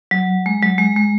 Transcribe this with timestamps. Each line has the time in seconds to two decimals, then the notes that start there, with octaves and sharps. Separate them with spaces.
0.11 F#3
0.46 G#3
0.62 F#3
0.78 G#3
0.96 G#3